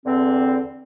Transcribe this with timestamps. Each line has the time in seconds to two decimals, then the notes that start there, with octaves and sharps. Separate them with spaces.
0.06 E2 D3 C4